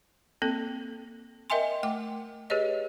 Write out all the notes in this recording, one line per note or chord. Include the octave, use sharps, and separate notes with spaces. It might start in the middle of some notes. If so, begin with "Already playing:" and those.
A#3 C4 A4
A#4 D#5 E5 G5 G#5 C6
A3 G5 D6
G4 G#4 B4 C#5 D#5